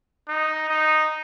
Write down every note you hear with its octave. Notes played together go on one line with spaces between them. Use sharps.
D#4
D#4